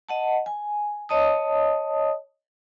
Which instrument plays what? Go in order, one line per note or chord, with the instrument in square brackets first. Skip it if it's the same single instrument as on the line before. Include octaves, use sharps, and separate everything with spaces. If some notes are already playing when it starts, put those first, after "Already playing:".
[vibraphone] D#5 F#5 A5
G#5
C#5 D#5 A5 D#6